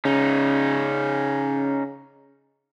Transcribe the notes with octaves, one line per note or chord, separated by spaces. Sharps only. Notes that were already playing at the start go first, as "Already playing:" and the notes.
C#3 C#4 D#4